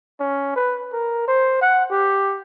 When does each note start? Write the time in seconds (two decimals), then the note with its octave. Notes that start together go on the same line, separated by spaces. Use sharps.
0.20 C#4
0.56 B4
0.93 A#4
1.27 C5
1.61 F#5
1.91 G4